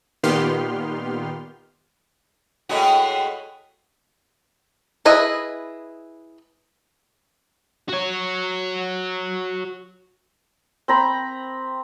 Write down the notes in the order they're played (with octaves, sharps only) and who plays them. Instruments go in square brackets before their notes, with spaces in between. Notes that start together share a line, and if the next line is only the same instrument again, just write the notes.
[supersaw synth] A#2 D#3 B3 G4 C6 F6
[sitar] A2 G#3 F#4
[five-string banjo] E4 G#4 B4 D#5 E5
[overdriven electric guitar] F#4 C#5
[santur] C4 A#5 B5